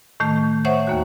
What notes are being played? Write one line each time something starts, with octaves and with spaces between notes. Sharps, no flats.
A2 D#3 A3
C5 C#5 E5 F#5 C#6
D#2 A#3 F#4